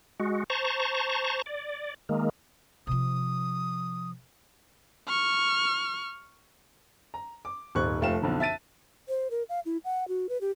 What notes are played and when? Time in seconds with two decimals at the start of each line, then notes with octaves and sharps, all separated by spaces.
0.20 G#3 F#4
0.50 C5 A5 A#5 C#6
1.46 D5
2.09 D#3 G#3 A#3
2.87 C3 F3 D#6
5.08 C#6 F6
7.14 A#5
7.45 D6
7.75 D#1 G#1 C#6 F#6
8.01 F1 F3 A3 F5 G5 E7
8.22 B1 F2 D3
8.40 E5 A5 A6 D#7
9.09 C5
9.31 A#4
9.49 F5
9.66 E4
9.85 F#5
10.08 F#4
10.29 B4
10.41 G4